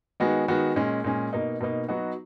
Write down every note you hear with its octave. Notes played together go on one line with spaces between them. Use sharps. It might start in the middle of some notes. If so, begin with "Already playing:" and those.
D#3 G#3 B3 F#4
D#3 G#3 B3 F#4
A#2 G#3 C#4
A#2 G#3 C#4
B2 A#3 D#4
B2 A#3 D#4
F#3 B3 D#4 F#4